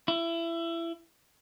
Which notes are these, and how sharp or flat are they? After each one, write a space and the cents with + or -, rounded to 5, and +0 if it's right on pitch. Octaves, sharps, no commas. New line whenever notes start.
E4 +25